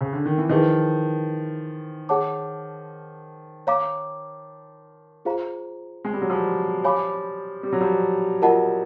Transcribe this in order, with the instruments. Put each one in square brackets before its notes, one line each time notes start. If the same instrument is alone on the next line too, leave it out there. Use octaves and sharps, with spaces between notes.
[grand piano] C#3
D3
D#3
E3
[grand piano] D#3 F3 [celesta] E4 G#4 B4 D#5
[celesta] G#4 C#5 F#5 A5 D6
C#5 F5 A#5 D6
F4 G#4 C5 F5 A#5
[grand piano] G#3
G3
F#3
F3 G3
[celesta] C#5 F5 G#5 B5 D6
[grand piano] G3
F#3
F3 G3
[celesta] F4 A#4 D#5 F#5 A5